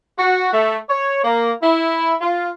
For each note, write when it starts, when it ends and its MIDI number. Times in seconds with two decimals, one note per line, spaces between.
0.19 0.49 66
0.54 0.77 57
0.90 1.20 73
1.24 1.52 58
1.62 2.15 64
2.21 2.49 65